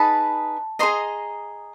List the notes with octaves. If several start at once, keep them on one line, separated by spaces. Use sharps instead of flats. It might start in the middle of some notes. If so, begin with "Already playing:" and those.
Already playing: D#4 G#4 B4 A5 B5
G#4 C5 D#5 A#5 C6